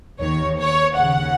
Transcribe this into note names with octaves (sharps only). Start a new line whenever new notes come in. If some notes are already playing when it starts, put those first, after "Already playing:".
D#2 D#3 C#5
C#5
D#2 C#3 F#5